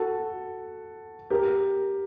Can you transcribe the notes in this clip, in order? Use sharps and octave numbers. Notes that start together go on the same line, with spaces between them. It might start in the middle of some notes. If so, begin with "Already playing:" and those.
Already playing: F#4 A4
G4 A#4